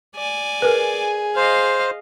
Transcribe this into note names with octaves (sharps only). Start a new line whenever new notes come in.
D5 G#5
G#4 A#4 B4
C5 D#5 F5